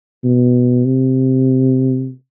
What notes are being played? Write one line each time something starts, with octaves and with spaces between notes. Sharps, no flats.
B2
C3